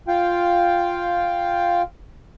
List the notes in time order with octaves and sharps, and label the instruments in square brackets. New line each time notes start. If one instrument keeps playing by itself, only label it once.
[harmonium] F4 F5 G5